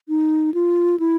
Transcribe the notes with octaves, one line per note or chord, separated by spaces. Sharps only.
D#4
F4
E4